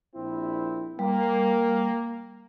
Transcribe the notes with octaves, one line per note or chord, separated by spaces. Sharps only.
A#1 C4 E4
G3 A#3